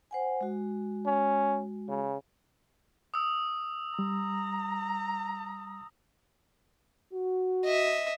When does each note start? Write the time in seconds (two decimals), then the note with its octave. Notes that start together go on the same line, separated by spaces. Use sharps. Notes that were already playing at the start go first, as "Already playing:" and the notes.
0.11 C5 F#5 G#5
0.41 G#3 F#4
1.06 C#4
1.89 C#3
3.14 D#6 E6
3.99 G3 A#5
7.12 F#4
7.64 D#5 E5